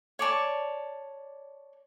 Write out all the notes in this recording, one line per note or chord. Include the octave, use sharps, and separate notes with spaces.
C#5 D5 A5 C#6